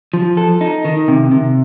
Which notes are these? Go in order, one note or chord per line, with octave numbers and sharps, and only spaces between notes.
F3
A4
D#4
D#3
C3
C3